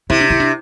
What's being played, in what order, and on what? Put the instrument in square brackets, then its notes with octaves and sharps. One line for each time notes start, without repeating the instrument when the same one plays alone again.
[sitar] C3 [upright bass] E4
[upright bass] D4
E4
D4